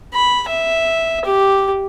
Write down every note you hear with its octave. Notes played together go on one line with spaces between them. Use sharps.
B5
E5
G4